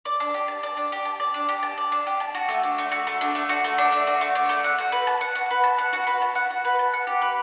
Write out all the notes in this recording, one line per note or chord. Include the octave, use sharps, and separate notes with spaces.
D5
D4
G4
A5
D5
D4
G4
A5
D5
D4
G4
A5
D5
D4
G4
A5
F#4
A3
D4
A3
F#4
A3
D4
A3
F#4
A3
D4
A3
F#4
A3
D4
A3
F#5
F#4
B4
A5
F#5
F#4
B4
A5
F#5
F#4
B4
A5
F#5
F#4
B4
A5
F#5
G4
B4